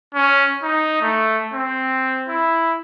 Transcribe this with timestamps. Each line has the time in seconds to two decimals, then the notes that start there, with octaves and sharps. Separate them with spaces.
0.14 C#4
0.63 D#4
1.01 A3
1.54 C4
2.28 E4